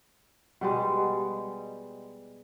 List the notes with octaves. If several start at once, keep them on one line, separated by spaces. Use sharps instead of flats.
B2 G3 G#3